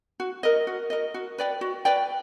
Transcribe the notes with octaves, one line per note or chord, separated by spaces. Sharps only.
F#4
A#4 D#5
F#4
A#4 D#5
F#4
B4 D5 G5
F#4
B4 D5 G5